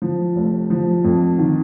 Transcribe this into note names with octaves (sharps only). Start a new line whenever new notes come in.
F3
F1
F3
F2
D#3